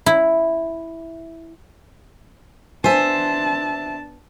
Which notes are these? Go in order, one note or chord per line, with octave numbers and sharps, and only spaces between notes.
E4
B3 D4 C5 E5 G#5 A5